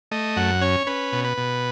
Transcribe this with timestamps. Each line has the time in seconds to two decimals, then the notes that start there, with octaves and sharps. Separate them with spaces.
0.11 A3 D#5
0.37 F#2 F#5
0.61 C#4 C#5
0.87 C#4 B4
1.12 B2
1.24 B4
1.37 B2